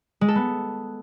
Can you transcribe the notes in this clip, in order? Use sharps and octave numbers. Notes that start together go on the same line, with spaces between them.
G#3
A4
B3